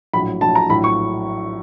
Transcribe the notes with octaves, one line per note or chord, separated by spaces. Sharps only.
A#1 A2 F#3 B5
A#1 A2 F#3 A5
A#5
A#1 A2 F#3 B5
C#6